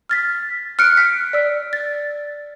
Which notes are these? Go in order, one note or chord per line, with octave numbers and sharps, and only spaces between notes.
F6 A6 B6
F6 F#6 C#7 D7
B6
D5 E6
A6